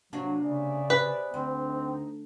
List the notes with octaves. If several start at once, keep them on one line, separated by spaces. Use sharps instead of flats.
C3 F#3 A#3 D4 F#4
C#3 G#4 D5 E5
C3 B4
D2 C4
D#4